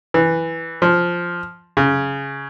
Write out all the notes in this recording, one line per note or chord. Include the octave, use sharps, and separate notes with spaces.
E3
F3
C#3